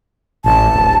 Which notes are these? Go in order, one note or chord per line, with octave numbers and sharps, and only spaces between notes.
A1 A5
D1